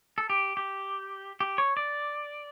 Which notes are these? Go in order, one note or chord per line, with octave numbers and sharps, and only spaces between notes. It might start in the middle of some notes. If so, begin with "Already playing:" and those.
A4
G4
G4
G4
C#5
D5